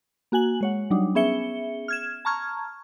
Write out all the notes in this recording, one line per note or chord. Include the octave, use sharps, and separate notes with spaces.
A#3 F#4 G#5 F#7
G#3 C#5 F#5
F#3 G3 D4 D#4
B3 C#4 G#4 E5 C#7 G7
F6 G#6 E7
A5 A#5 C#6 F6 G#6